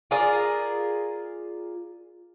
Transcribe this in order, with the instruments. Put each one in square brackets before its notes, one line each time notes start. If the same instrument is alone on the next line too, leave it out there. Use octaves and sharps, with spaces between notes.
[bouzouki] F4 G#4 A#4 D5